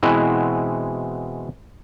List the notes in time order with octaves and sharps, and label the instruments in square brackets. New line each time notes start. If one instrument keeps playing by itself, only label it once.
[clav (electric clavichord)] B2 E3 G#3 C4 E4 F#4